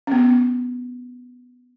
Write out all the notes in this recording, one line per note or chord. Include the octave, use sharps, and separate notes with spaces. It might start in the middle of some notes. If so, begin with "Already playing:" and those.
B3 C#4